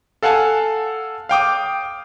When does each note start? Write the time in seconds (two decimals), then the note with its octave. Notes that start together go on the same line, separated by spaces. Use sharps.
0.23 A4 F5 F#5 G#5 A5
1.29 F5 G5 D6 D#6